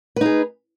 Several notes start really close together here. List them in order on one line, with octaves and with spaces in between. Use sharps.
B4 D#4 G#4